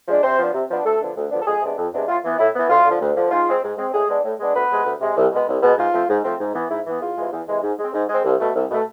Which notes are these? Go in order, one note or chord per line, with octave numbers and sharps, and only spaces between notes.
F3 G#3 D4
C3 C4 C5
F3 B3 D4
C3
F3 B3 D4
D2 A3 A4
D3 F3 B3 D4
D2
D3 F3 B3 D4
A4
F2 G#3 G#4
C3 G#3 B3 D4
F2
C3 G#3 B3 D4
A2 F4
E3 B3
A2 E4
E3 B3
D2 F4
D3 F3
D2
D3 F3
G#2 F4
G#3 C4
G#2
G#3 C4
A2 G#3 G#4
G#3 B3 D4
A2
G#3 B3 D4
D2 B3 B4
C3 G#3
D2
C3 G#3
C2
B2 G#3 B3
C2
B2 G#3 B3
G#2 F4
F3 A3 C4
G#2
F3 A3 C4
G#2
E3 B3
G#2 E4
E3 B3
E2 F4
C3 E3 G#3
E2
C3 E3 G#3
G#2
G#3 C4
G#2
G#3 C4
C2
B2 A3
C2
B2 A3